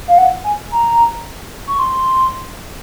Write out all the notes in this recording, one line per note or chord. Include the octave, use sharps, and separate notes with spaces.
F5
F#5
G#5
A#5
C#6
C6